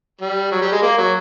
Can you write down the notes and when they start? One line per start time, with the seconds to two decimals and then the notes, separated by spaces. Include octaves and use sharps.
0.21 G3
0.51 F#3
0.61 G3
0.72 G#3
0.82 A#3
0.98 F#3